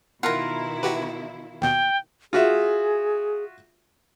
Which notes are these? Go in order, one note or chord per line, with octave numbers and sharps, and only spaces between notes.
B2 D#3 E4 F4 A#4 F#5 A#5
F#4 G4 B4
D#2 B2 G5
F4 F#4 G#4 E5